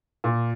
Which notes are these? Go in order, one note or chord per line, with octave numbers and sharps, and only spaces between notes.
A#2